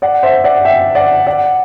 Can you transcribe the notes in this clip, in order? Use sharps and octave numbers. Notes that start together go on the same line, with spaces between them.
D5 F#5
C5 E5
D5 F#5
E5 G5
D5 F#5
D5 F#5